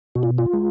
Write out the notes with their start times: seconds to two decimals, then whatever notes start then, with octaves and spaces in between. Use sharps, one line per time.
0.15 B2 F#4
0.23 F4
0.38 F4
0.53 G#3